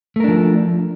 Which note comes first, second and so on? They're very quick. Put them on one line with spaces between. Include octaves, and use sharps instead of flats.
A3 A#4 D4 F3